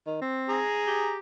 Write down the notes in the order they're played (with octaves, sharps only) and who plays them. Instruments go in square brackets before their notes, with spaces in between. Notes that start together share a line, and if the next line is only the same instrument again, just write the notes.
[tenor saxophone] D#3
C4
[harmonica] G#4 A#5
[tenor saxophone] G4